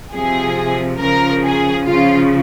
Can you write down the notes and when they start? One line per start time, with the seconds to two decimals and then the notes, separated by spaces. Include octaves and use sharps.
0.14 C3 F3 G#4
1.00 C#3 F3 A#4
1.43 G#4
1.86 C#3 F3 F4